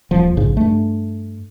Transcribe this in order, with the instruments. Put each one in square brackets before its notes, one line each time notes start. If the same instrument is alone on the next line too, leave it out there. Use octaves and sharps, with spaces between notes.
[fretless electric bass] D#1 F3
A#1 G#2 C#3
G2 A3